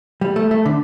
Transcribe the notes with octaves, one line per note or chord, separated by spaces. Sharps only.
G3
A3
A3
D3